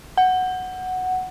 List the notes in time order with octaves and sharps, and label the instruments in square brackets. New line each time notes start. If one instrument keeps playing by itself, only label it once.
[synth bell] F#5